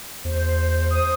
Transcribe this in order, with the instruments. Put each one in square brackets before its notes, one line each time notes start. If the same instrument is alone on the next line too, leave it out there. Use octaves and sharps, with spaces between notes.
[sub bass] E2 [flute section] C5
[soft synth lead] D#6